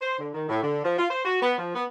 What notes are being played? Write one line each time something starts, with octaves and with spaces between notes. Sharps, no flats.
C5
D3
D#3
A2
D3
F3
F4
C5
F#4
B3
F3
B3